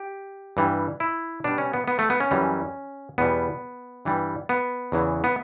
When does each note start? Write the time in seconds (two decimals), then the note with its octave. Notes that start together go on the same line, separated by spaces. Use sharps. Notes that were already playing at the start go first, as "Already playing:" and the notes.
Already playing: G4
0.57 G2 E3 G3
1.00 E4
1.44 B2 G3 D4
1.58 C#4
1.73 B3
1.88 B3
1.99 A3
2.10 B3
2.20 C#4
2.31 F#2 E3 G3
3.18 E2 B2 G3 B3
4.05 G2 E3 G3
4.49 B3
4.92 E2 C#3 E3
5.24 B3